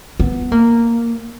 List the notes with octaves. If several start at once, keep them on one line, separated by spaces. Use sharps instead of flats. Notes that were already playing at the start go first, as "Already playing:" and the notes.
B3
A#3